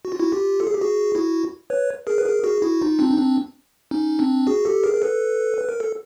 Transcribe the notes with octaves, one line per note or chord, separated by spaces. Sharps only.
F#4
F4
E4 F#4
F4 G4
A4
G#4
G4
F#4 G#4
E4 F#4
B4 C#5
G#4 A#4
B4
G#4 A#4
F#4 G#4
E4 F#4
D#4 F4
C4 D4
D#4
C4 D4
C#4 D#4
C4 D4
F#4 G#4
G4 A4
G#4 A#4
A#4
A4 B4
B4
A#4
A4